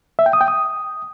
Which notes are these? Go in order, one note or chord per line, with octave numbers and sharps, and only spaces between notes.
E5
G5
D#6
G5
D#6